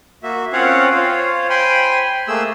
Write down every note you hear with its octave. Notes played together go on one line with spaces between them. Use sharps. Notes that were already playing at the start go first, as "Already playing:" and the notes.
A#3 F#4 E5
C4 C#4 F4 C#5 F5 F#5
F4 C5 C#5 F5
C5 G5 G#5 B5 C6
A3 A#3 G#4 E6